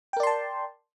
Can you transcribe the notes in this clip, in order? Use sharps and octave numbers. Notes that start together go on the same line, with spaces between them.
A#4 D5 G5 A5 C6